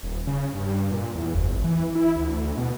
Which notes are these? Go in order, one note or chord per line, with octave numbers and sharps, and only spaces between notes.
D#1
C#3
G2
A#2
E2
F#1
G#1
E3
E4
D2
B2